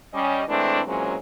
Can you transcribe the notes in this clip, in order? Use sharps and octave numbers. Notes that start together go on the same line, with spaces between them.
G3 C#4 D#5
E3 G#3 A3 C4 D4
A#2 E3 F#3 G#3 C4 C#4